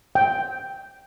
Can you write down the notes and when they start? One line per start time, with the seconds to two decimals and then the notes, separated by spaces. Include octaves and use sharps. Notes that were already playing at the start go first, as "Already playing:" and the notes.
0.15 G5